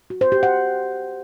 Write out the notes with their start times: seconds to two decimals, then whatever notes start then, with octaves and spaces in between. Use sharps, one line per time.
0.10 F#4
0.21 C5
0.32 G4
0.43 F#5